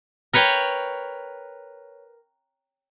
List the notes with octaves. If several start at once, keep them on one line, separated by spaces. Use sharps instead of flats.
A#4 B4 C#5 G5